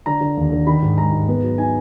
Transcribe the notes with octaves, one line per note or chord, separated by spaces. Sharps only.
D3 A#5
D3
D#2
D3
D#3 B5
G#2
G#3 A#5
G#2
B3
F#3
D#4 G#5